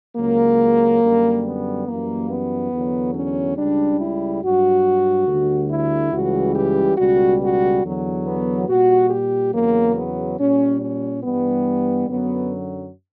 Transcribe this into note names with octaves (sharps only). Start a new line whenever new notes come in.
C#2 C#3 F#3 A#3
F#2 D3 G3
B3
F#2 E3 G3 A#3
B3
E2 D3 F#3
C#4
C#2 C#3 G3 D4
E4
G2 F#3 F#4
D2 D3 G3
E4
C#2 C#3 E3 G3 F#4
G4
C#2 B2 G3 F#4
F#4
E2 D3 F#3
B3
A#2 G3 F#4
G4
E2 C#3 F#3 A#3
B3
A#2 G3 C#4
C#4
G2 E3 G3 B3
F#2 D3 F#3 B3